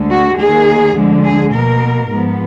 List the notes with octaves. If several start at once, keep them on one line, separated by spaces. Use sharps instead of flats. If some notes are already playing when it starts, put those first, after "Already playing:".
Already playing: D2 D3 G#3
F#4
D#2 D#3 A#3 G#4
D2 D3 F3 G#3
G#4
B2 A#3 A#4
G#2 F3 B3